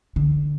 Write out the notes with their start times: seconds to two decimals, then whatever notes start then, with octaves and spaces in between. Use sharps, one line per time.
0.16 D3